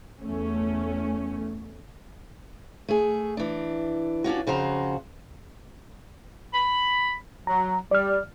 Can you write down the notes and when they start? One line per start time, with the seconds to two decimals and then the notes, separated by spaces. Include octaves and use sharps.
0.23 E2 A3 C#4
2.89 A3 G#4
3.37 E3 D4
4.24 C#4 D4 F4 F#4
4.47 F2 C#3 F#4 C5 A#5
6.53 B5
7.47 F#3 A#5
7.91 G3 D5 F6